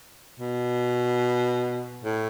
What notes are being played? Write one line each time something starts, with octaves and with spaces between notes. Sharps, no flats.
B2
A2